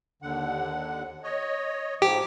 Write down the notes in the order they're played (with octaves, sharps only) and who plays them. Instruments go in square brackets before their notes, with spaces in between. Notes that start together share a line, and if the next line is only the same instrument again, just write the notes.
[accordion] D#2 D3 F#5
C#5 D#5
[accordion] G#2 F3 [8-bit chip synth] G4